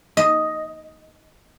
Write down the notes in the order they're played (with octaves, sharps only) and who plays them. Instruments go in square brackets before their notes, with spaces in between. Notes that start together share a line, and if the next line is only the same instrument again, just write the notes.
[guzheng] D#5